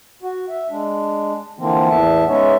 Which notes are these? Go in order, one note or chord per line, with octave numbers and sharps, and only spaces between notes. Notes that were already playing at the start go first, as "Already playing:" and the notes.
F#4
E5
G#3 D4
D3 E3 F3 A#3 C4
E2 A2 B3 E5 A5
G#3 B3 C#4 D#4 C#5 E5